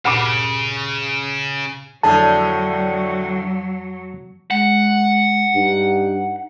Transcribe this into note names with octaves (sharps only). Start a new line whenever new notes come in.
D2 G2 A#2 C#3
F2 A2 D3 F#3 G#4 A5
G#3 F#5
G2 D#4